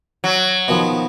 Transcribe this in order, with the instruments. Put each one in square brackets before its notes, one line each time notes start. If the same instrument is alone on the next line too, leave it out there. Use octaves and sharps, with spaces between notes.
[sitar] F#3
[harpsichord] B2 D#3 F3